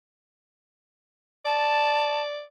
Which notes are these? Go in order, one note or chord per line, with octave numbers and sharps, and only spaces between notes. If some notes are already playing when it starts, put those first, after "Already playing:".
D5 A5